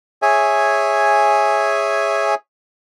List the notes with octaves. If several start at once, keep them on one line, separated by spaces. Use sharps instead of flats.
G#4 C#5 E5 G#5